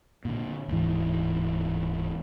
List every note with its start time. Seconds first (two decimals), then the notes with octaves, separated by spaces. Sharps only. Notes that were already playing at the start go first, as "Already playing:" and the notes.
0.25 A#2 D3
0.68 D1 G#2 E3